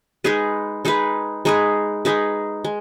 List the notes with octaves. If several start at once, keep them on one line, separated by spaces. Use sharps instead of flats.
G#3 D#4 G#4 B4
G#3 D#4 G#4 B4
G#3 D#4 G#4 B4
G#3 D#4 G#4 B4
G#3